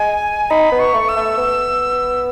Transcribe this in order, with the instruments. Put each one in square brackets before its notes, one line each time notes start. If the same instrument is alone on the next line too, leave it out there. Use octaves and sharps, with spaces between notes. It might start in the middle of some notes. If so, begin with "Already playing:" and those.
Already playing: [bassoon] G#3 [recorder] G#5
[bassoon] D#4 [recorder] B5
[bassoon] B3
[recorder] C#6
[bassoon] A3
[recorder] E6
[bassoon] A3
B3